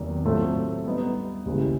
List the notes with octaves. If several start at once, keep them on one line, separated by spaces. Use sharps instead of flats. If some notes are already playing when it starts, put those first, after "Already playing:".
Already playing: E2 C3 D#3 F#3 A#3
A2 F#3 A3 C4 F4
G3 B3 D#4
D#2 C#3 E3 G#3